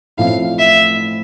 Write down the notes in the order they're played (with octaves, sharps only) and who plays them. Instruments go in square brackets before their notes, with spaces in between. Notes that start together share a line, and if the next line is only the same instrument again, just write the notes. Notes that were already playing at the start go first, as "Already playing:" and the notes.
[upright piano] A1 A2 F3 C4 E4 [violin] F5
[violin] E5